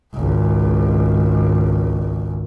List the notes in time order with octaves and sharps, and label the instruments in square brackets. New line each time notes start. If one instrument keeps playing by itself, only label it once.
[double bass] G#1 C#2